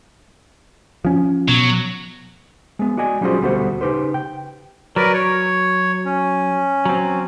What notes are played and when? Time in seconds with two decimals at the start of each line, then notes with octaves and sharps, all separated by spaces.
1.05 F3 C#4
1.48 B2 F#3
2.79 G#3 B3
2.97 F#4 D5 D#5 G#5
3.21 F#3 G3 C#4 F4 G#4 C5
3.41 D2 B2 G3 A3 F#4 C5
3.81 C#3 D#4 G4 B4 C5
4.14 G5
4.96 F#3 A#4 B4 D5
5.14 C#5
6.05 C#4
6.85 F#3 C4